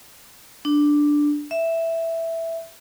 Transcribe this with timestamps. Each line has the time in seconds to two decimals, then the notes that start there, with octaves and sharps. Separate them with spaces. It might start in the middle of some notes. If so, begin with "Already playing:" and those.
0.65 D4
1.51 E5